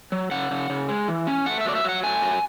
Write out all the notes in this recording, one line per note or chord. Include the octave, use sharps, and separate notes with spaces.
F#3
C#3 F#5
C#3
C#3
G#3
E3
C#4
A3 F#5
E5
F#3 D5
E5
F#3 F#5
A3 G#5
F#3